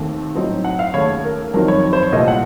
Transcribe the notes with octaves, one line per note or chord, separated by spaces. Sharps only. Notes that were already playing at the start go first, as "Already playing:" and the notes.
Already playing: D#2 D#3 A3 C4
A2 F#3 C4 D#4
F#5
F5
D#2 C#3 A3 C#5
C#5
A#4
F2 D#3 F#3 C4 D#4 A#4
C#5
C#5
C5
C#5
C2 A#2 A3 C4 D#5
F#5